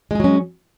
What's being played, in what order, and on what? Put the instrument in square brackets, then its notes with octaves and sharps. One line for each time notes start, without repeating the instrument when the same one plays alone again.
[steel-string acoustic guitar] G#3
G#4
F#3
C#4